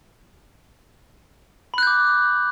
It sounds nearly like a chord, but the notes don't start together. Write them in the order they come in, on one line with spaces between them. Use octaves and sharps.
B5 F#6 G6 D6